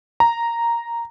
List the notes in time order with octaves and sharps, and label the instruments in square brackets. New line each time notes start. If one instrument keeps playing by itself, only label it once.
[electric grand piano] A#5